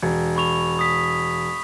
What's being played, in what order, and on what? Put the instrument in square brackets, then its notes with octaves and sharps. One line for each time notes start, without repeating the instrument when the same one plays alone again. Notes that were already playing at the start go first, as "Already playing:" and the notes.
[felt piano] E1
[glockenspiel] B5 C#6 F7
D#6 B6